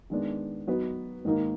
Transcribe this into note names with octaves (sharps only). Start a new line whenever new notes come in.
D#3 G#3 B3 D4
F#3 B3 D#4 F#4 B4
G#2 D#3 A#3 D#4